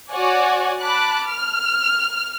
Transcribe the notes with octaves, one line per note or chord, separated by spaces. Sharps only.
F#4 C#5 D5 F#5 G#5
A5 B5 D6 F#6
F6